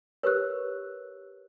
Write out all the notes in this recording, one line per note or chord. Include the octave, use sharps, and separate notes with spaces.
G4 A#4 B4 C#5 E6 F#6